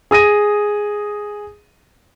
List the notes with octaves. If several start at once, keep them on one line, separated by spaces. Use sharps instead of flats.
G#4 D#6 A#6 D#7